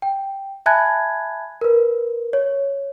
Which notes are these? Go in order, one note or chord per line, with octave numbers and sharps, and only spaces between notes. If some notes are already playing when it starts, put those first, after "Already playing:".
G5
E5 G#5 A5 B5 F#6 G#6
A#4 B4
C#5